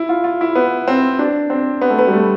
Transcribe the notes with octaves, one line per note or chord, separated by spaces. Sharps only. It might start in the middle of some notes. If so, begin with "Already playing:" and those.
Already playing: E4
F4
F4
E4
B3
C4
D4
C4
B3
A3
B3
G3
A3